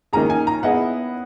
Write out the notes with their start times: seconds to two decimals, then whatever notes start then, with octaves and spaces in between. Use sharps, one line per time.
0.13 D#3 A#3 C#4 G#4 A#5
0.30 G#5
0.47 A#5
0.63 B3 E4 G#4 D#5 F#5